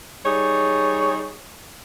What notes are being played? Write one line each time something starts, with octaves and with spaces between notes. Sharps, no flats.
G3 D#4 G#4 C#5